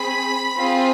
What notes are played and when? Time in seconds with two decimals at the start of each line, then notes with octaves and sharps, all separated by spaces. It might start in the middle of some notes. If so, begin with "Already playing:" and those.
Already playing: C4 G#4 B5 B6
0.56 C4 F4 G#4